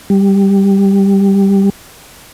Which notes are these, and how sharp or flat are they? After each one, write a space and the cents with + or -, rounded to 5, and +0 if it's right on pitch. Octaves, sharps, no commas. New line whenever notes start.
G3 +5